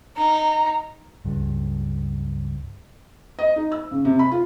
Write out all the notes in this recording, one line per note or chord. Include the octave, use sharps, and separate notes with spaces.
D#4 A#5
C#2 G2
D#5
D#4
E6
C#3
C3
B5
F4